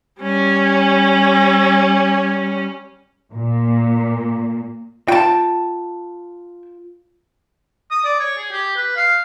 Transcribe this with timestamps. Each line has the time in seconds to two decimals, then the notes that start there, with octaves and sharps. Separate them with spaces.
0.22 G3 C#4
3.33 A#2
5.08 F4 G5 A5
7.91 D#6
8.04 D5
8.19 C#5
8.37 G#4
8.52 G4
8.76 B4
8.97 F5